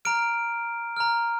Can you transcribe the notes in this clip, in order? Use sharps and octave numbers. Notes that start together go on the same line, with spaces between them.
A#5 F6 D7
A#5 F6